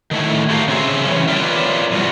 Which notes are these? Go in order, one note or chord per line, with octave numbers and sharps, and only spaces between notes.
D#3 A3 E4
F#4 G4 A4 A#4 F5
C#3 C4 G#4 E5
E3 G3 C#4
F4 A#4 B4 C#5 D5 E5
E2 C3 G3 B3 F4 F#4